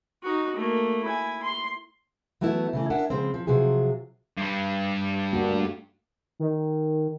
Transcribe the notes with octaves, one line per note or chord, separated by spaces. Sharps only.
D#4 F#4
A3 A#3
E4 G#5
C6
E3 F#3 A3 B3 E4
C#3 E3 A3
D4 A#4 E5 F#5 G#5
C#3 F3 G#3 C4
F3
C3 F3 F#3 G#4
G2 G3
A#3 D4 F#4
A3
D#3